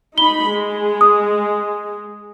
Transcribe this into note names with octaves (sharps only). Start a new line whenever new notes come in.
D#4 B5 G7
G#3
D#6